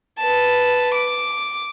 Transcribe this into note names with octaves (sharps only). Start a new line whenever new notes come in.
B4 A5
D6